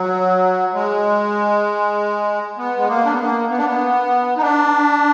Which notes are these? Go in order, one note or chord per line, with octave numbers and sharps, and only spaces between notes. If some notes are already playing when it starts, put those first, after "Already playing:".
Already playing: F#3
G#3
B3
G#3
A#3
D4
B3
A#3
B3
D4
B3
D#4
D4